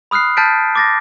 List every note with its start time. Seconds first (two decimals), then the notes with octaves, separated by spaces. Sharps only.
0.11 B5 D#6 F6 F#6 C7
0.37 A5 F6 G6 A6 B6 D7
0.75 D6 A6 A#6